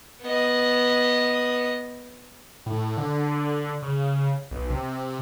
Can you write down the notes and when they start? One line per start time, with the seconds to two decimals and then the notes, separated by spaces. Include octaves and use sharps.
0.22 B3 D#5
2.66 A2
2.97 D3
3.82 C#3
4.51 B1
4.70 C3